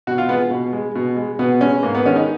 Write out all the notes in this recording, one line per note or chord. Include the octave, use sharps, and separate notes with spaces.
B2 F#4
F4
G#3 B3
B2
G#3
B2
G#3
B2 B3
G#3 C#4
G#2 A#3
B3
D#3 G#3 C#4
D#4